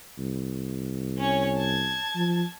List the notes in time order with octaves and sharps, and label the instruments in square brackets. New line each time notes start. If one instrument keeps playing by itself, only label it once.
[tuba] C2
[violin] C#4 C#5
A5 G#6
[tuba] F3